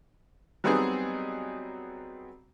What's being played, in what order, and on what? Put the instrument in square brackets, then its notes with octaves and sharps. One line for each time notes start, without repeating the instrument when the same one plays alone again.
[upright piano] F#3 G3 B3 C4 D#4 G#4